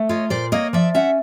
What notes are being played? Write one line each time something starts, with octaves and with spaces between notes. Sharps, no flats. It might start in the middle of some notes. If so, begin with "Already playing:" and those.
Already playing: A3
F4 C#5 D#5
A#2 C5 D5
A#3 C#5 D#5
F3 D5 E5
C#4 E5 F#5